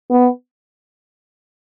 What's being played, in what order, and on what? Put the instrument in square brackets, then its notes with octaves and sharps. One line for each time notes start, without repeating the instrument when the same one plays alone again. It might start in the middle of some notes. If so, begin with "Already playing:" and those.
[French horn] B3